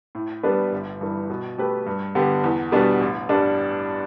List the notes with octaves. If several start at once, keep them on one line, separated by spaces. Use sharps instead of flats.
A2
G3 B3 D4 B4
G1
G2 E3
B2
A3 G4 B4
G2
D3 B3 G4
E2
B2 G3 B3 D4
A1
G2 G3 D4